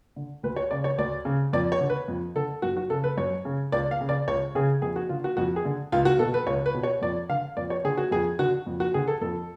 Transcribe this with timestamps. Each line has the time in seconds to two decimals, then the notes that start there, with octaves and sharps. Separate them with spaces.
0.16 D3
0.43 D2 B4
0.56 C#5
0.71 C#3 D5
0.84 C#5
0.98 D2 D5
1.25 C#3
1.53 F2 D5
1.72 C#5
1.81 D3
1.90 B4
2.08 F2
2.35 D3 A4
2.62 F#2 F#4
2.77 F#4
2.90 C#3 A4
3.04 B4
3.17 F#2 C#5
3.45 C#3
3.72 C#2 D5
3.91 F5
4.01 C#3
4.09 D5
4.28 C#2 C#5
4.55 C#3 G#4
4.82 F2 G#4
4.96 F#4
5.09 D3 F4
5.24 F#4
5.37 F2 F#4
5.56 G#4
5.65 D3
5.92 C#2 F4
6.05 F#4
6.19 B2 A4
6.34 B4
6.47 C#2 C#5
6.66 B4
6.75 B2
6.83 C#5
7.02 F2 D5
7.29 D3 F5
7.57 F2 D5
7.70 C#5
7.84 D3 G#4
7.97 F#4
8.11 F2 G#4
8.39 D3 F#4
8.67 F2
8.80 F#4
8.94 D3 G#4
9.08 A4
9.21 F2 A4